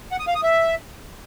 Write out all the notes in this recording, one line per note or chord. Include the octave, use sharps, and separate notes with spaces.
F#5
D#6
F5
D#6
E5